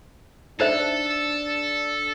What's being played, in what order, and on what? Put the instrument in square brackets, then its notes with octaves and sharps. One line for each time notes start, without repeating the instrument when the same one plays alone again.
[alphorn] D4 [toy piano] D#4 C5 E5 [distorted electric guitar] A4